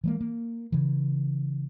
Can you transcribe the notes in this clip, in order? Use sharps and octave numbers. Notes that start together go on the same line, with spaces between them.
E3 G#3 A#3
A#3
C#3 E3